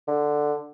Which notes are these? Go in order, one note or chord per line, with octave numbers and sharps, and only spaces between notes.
D3